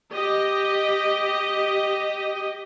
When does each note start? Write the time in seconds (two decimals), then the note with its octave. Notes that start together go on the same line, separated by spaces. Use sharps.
0.13 G4 D#5